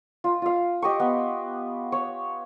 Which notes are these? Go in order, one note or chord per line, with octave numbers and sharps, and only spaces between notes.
F4
F4 F5
G4 D#5 G5 C#6
B3
C#5